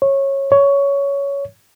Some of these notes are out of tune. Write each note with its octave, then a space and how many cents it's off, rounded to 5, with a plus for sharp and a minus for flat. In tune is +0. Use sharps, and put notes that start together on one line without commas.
C#5 -15
C#5 +15